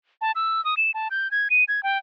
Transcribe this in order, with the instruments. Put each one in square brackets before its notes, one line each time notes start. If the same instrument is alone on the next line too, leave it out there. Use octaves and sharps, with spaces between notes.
[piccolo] A5
E6
D#6
E7
A5
G6
G#6
D#7
G#6
G5